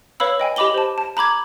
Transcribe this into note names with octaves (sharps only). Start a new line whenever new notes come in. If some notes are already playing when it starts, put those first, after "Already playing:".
B4 C#5 F5 B5 E6
D#5 G5 G#5
G4 D#5 B5 D6 F#7 G7
C5 A5
A5
A#5 B5 D6 G#6